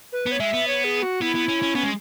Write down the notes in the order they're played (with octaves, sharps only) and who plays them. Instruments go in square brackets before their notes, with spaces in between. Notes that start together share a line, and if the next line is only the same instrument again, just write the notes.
[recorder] B4
[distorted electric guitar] B3
[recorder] C#5
[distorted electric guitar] G#3 [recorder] E5
[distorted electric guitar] B3
[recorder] C#5
G#4
F#4
[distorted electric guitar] B3 [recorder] E4
[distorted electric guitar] B3
C#4
C#4
[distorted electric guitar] B3 [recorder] C#4
[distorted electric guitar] G#3